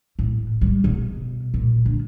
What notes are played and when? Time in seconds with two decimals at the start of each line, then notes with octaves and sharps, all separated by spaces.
0.19 A2
0.61 G3
0.84 B2
1.54 A#2
1.86 D3